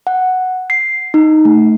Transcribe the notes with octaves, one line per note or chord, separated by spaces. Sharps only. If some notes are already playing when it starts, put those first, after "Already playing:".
F#5
C7
D#4
A3